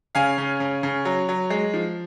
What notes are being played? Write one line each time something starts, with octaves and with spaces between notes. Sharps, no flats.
C#3 F5 G#5
C#3
C#3
C#3
F#3
F#3
G#3
F3